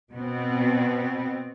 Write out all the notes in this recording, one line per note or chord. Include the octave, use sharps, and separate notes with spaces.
B2 B3 C4